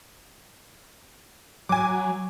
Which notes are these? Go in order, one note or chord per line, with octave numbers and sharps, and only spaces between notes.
F#3 G#5 D6